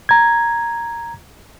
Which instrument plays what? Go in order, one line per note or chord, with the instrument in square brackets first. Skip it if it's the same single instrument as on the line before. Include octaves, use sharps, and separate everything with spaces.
[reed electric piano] A#5 G#6